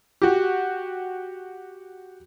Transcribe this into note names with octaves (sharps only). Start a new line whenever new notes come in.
F#4 G4